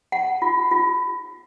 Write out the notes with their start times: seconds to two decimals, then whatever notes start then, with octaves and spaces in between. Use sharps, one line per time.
0.12 F#5
0.42 F4
0.71 F4